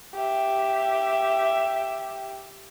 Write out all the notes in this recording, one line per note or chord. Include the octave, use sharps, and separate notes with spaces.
G4 E5